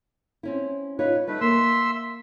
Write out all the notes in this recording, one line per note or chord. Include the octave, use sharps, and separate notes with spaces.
C4 C#4 E4
D#4 F4 B4 C#5
G3 A3 D#4 B4
A#3 E5 C6 E6